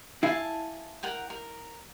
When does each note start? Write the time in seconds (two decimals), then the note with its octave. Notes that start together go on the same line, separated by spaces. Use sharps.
0.23 E4 F5 G#5 A5
1.03 A#4 F#5 G5
1.30 A#4